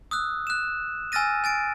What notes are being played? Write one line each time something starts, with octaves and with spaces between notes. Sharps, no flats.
D#6 E6 F#6
F#6 E7
G#5 E6 F6 A6 A#6 D#7
G#5 A6 D7